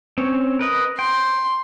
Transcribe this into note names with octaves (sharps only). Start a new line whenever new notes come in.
C4 C#4 C#5
A#4 B4 D#5
G5 C6